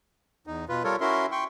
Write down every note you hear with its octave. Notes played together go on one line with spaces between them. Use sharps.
E2 D#4
B2 F4 B4
G3 F4 A4 A#4 C#5
C#4 E4 F#4 A#4 E5 C6
G5 C6 C#6